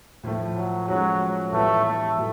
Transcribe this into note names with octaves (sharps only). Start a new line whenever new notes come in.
A2 F3 A3
F#3
F3 F#3 G#3 C#4 F#4
A2 E3 G3 A3 B3
A3
A2 F#3